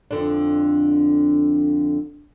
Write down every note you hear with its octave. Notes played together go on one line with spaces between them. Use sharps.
F2 D3 D4